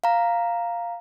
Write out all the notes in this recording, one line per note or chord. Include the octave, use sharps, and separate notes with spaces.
F5 A#5